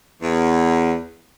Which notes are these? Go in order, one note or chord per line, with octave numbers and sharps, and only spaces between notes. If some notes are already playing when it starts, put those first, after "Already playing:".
E2